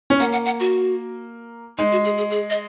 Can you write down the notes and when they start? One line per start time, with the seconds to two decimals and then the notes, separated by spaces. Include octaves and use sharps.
0.10 C#4
0.20 A#3 F#5
0.33 F#5
0.45 F#5
0.60 F#4
1.78 G#3 D#4
1.92 F#4
2.05 G#4
2.18 G#4
2.31 G#4
2.50 D#5